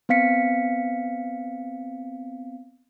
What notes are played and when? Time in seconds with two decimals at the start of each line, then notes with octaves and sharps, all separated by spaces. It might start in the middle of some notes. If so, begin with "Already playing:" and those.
0.09 B3 C4 F5 B6 C#7